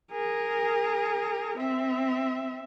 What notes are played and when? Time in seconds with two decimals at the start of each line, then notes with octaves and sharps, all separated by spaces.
0.11 G#4 A#4
1.57 C4 E5